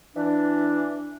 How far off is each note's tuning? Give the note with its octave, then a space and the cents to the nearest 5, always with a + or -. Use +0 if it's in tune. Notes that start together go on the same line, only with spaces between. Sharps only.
E3 +10 D4 +0